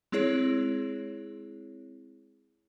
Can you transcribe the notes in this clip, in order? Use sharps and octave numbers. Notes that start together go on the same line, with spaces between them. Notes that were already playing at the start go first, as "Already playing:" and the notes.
G#3 C4 E4 G#4 C#5